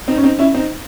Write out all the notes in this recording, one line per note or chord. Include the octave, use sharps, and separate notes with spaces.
C4 D#4
C#4
C4 D#4
C#4 E4
C4 D#4